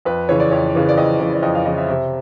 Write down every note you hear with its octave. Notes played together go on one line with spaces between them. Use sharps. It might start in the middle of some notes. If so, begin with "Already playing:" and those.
F2 B4
C#3 E3 C#5
D5
F2 C#5
C#3 E3
D5
F2 D#5
C#3 E3
D5
F2 D#5
F5
C#3 E3 D#5
E5
C3 E5